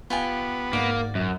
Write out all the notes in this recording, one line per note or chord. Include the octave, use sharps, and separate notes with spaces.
B3 F4 G4 G#5
G#2 A#3 F#4 D5
F#2